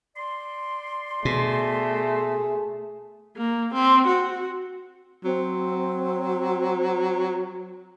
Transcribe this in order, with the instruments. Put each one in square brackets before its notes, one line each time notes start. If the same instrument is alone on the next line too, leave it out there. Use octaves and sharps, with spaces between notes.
[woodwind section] D5 C6
[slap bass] B2 [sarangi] A3 [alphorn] G#4
[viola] A#3
C4
F#4
[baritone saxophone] F#3 [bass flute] C4